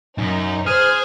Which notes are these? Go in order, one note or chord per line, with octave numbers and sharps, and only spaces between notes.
F#2 D#4
G#4 C5 G#5 F6